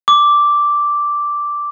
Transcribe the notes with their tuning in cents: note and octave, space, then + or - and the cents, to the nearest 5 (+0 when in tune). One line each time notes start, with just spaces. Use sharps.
D6 -5